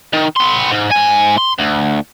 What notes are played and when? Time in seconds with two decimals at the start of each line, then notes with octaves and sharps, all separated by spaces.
0.13 D#3
0.36 B3 C6
0.71 G#2
0.91 G#2 G#5
1.37 C6
1.58 D2